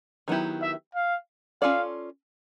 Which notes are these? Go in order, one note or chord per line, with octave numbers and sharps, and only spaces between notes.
D#3 F#3 B3 E4 G4
E5
F5
C#4 F4 A4 D5 F5